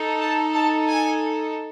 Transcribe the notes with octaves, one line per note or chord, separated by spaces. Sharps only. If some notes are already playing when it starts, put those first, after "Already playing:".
Already playing: D#4 A4
A5
A5
G#5